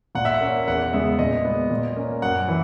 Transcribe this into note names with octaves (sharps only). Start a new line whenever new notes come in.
A#2 F#5
E5
F#5
A#3 C#4
E2 F#5
C#3 G#3 B3 E5
A#2 D#5
G#3 B3
A#2
A#3 C#4
F#2 F#5
E3